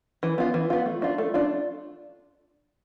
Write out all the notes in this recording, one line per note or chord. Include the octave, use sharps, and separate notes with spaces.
E3
B3 F4
E3
B3 F4
A3
D4 F4
A3
D4 F4